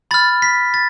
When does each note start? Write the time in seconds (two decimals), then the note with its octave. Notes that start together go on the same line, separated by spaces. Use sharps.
0.11 B5 F6 A6
0.42 B6
0.74 A6